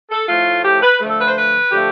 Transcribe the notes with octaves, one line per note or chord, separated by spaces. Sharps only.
A4
A2 F3 A3 F4
G4
B4
D3 F3 A3
A4
B4
C5
B4
D3 F3 A3 G4